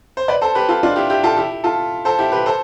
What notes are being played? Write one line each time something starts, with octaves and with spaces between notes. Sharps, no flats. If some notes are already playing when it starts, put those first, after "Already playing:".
C5
B4 D5
A4 C5
G4 B4
F4 A4
D4 F4
E4 G4
E4 G4
F4 A4
E4 G4
F4 A4
A4 C5
E4 G4
G4 B4
A4 C5